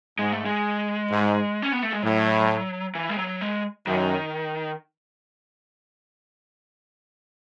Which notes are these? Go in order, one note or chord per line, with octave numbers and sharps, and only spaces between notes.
G#2 G#3
A3
G#3
G#2
C#4
B3
A3
G#3
A2 F#3
E3
G#3
F#3
G#3
F#2 D#3